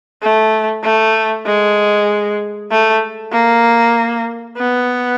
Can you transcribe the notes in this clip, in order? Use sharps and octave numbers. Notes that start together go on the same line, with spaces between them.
A3
A3
G#3
A3
A#3
B3